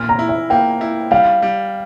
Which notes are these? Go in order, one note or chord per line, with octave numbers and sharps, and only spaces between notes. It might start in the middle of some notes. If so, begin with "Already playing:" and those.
Already playing: A#2 F6
A#5
E4
E5
A#3 G5
E4
G3 F5
G3